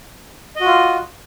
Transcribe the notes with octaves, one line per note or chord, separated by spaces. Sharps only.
F4 F#4 D#5